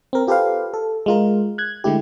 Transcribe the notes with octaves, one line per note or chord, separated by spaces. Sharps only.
C4 A#4
F4 G4 A4 B4 C5 F5
A4
G#3 F4 A#4
F#6 G#6
D3 G#3 A3 E4 G4